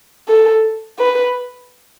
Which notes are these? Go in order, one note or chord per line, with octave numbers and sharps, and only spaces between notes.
A4
B4